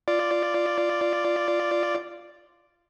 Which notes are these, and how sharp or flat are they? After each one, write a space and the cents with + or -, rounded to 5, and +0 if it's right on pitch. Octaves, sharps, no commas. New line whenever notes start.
F4 -10 D5 +0